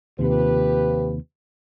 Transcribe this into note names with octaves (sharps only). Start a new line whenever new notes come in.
D#2 C3 F3 G4 B4